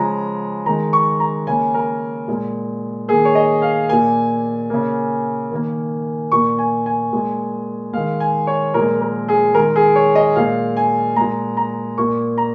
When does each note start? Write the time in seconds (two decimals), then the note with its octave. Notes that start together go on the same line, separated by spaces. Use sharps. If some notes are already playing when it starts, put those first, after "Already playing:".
Already playing: C#3 F3 G#3 A#5
0.66 D#3 G#3 A#5
0.93 C#6
1.20 A#5
1.47 C#3 A#3 G#5
1.74 A#4
2.28 A#2 G#3
3.08 D#3 A#3 G#4
3.25 C#5
3.35 D#5
3.62 F5
3.89 A#2 A#3 G#5
4.70 C#3 A#3
5.51 D#3 A#3
6.32 A#2 A#3 C#6
6.59 G#5
6.86 G#5
7.13 A#2 G#3
7.93 D#3 G#3 F5
8.20 G#5
8.47 C#5
8.74 A#2 F3 G#3 A#4
9.01 A#4
9.28 G#4
9.54 D#3 G#3 A#4
9.76 G#4
9.95 C#5
10.15 D#5
10.36 A#2 G#3 F5
10.77 G#5
11.16 A#2 G#3 A#5
11.57 A#5
11.98 A#2 A#3 C#6
12.38 A#5